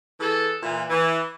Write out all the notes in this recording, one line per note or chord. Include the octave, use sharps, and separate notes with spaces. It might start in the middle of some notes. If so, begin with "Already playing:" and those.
E3 G#4 A4
A#2 E3
E3